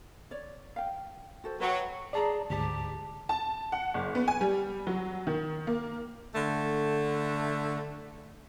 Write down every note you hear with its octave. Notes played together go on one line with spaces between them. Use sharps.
C#5 D5
F5 G5
F#4 A4 C5
F#3 B4 E5 G5
G#4 D5 A5 A#5
D2 G#2 G4 A5
A5
F#5
F#1
B3
G#5
G3
F#3
D#3
A#3
D3 A3